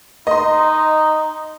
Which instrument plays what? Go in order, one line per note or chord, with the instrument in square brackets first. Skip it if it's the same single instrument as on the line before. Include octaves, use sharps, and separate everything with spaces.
[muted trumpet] D#4 [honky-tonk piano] D#5 C6